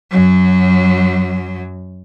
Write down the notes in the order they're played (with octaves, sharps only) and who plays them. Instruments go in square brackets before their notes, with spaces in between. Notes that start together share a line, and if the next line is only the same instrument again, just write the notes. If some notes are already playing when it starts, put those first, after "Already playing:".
[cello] F#2 F#3